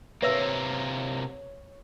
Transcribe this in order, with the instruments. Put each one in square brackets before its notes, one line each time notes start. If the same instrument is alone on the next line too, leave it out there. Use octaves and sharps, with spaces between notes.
[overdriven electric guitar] C3 A#3 [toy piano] B4 E5 E6 [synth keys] C#5